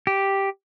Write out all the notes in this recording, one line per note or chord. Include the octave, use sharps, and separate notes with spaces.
G4